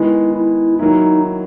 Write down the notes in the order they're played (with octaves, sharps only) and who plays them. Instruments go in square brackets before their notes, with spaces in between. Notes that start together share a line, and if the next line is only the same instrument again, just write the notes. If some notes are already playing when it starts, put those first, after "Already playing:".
Already playing: [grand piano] D#3 G#3 B3 [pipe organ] E4
[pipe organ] E4
[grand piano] D#3 F#3 A#3 E4 [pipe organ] D#4